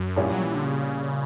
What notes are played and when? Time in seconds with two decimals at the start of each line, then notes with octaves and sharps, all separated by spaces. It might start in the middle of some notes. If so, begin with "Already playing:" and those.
Already playing: F#2
0.16 A#1 A#2 G3 C#4 E4
0.32 F#3
0.43 E3
0.54 D3
0.65 C#3